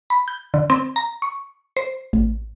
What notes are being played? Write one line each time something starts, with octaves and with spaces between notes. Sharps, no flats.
B5
G6
D3
C4
A#5
C#6
C5
A1